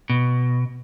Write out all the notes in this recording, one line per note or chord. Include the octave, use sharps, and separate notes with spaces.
B2